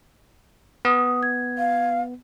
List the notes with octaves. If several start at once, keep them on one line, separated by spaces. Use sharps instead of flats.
B3 D#6
G#6
F5